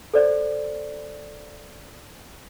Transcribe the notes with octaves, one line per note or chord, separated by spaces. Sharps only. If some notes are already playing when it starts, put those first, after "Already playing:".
A4 C5 D5